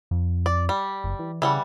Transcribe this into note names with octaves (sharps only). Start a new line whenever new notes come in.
F2
D5
G3
F#1
E3
C#3 E3 G3 F#5